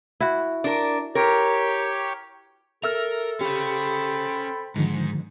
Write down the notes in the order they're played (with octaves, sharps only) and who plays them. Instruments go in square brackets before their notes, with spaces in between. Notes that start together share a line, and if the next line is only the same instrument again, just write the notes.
[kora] E4 F#4
[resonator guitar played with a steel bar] D4 A#4
[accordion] G4 C#5 [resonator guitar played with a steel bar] A#4
[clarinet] A4 [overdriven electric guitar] A#4 [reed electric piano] E5 E6 F6
[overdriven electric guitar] C#4 F5 [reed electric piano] G4 [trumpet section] C5 G5 B5
[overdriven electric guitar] G#2 [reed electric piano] D3 D#3 F3